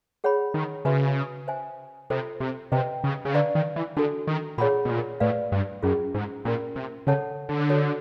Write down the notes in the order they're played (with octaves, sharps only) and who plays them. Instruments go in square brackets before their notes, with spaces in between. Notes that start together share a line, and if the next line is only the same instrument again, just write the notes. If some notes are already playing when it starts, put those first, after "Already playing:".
[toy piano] G#4 C#5 F#5 B5
[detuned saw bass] D#3
[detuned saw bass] C#3 [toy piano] F#4 B4 E5 G#5
[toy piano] C5 E5 G#5
[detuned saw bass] C3 [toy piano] F4 A4 C5
[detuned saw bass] C3
[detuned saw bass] C3 [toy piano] B4 D#5 G5
[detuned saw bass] C#3
C#3
[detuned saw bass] D3 [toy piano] B4 D5 F5 A#5 C#6
[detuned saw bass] D#3
E3
[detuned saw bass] D3 [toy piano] D4 F#4 A4
[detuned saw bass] D#3
[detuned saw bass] A#2 [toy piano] G#4 C#5 F#5 B5
[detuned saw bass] B2
A#2
[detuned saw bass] A2 [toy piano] B4 D5 F5
[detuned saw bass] G2
[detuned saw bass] F#2 [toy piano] C#4 F4 G#4
[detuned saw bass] G#2
[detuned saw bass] A#2 [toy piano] C#4 F4 A#4
[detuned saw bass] C3
[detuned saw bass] C#3 [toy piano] A4 C#5 F#5 A5
[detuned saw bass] D3
[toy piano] F#4 A4 C#5